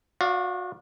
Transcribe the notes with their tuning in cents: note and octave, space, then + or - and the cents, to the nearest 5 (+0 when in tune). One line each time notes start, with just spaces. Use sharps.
F#4 -30 D5 +0 F5 +0